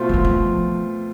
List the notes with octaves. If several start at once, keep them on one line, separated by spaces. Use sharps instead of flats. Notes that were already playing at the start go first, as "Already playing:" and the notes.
Already playing: B2 A3 C4 F4
F3
E3
F3